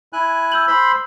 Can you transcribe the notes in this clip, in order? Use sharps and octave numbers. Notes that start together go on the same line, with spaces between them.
E4 G#5 F#6
E6 G6 F#7
C5 B5 C6